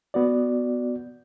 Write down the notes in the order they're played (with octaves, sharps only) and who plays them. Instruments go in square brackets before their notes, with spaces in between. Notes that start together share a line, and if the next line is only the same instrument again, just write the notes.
[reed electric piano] B3 F#4 D5